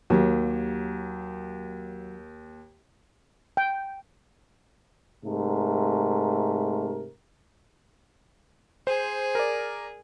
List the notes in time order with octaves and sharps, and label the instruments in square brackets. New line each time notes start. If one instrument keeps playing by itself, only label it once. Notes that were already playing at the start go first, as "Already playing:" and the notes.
[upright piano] D#2 [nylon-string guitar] F#3 A#3 G4
[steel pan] G5
[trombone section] G#2 C3 A3 A#4
[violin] G#4 [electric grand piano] C5
[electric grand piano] A#4 D5